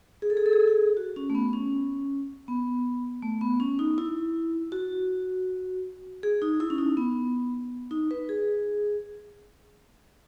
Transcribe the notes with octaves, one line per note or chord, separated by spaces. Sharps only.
G#4
A4
G#4
A4
G#4
A4
G#4
F#4
C#4
A3
B3
C#4
B3
A3
B3
C#4
D#4
E4
F#4
G#4
D#4
E4
C#4
D#4
B3
D#4
B4
G#4